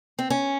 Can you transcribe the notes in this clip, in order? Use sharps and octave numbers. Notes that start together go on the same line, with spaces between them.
C4
C#4